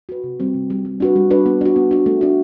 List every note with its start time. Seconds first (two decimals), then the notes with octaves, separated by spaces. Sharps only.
0.09 F#4 B4
0.24 C3
0.40 G3 C4
0.54 C3
0.70 G3 C4
0.85 G3
1.00 D4 F#4 B4
1.16 G3
1.31 D4 F#4 B4
1.46 B3
1.61 D4 F#4
1.76 B3
1.91 D4 F#4
2.06 A3
2.21 D4 F#4